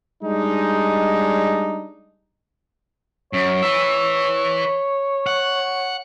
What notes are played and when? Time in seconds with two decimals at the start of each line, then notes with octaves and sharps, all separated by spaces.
0.22 G3 G#3 D4 D#4
3.33 F#2 C#5
3.63 B4 E5
5.27 F#5